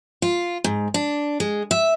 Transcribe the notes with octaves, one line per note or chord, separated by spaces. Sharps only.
F4
G#2
D4
G#3
E5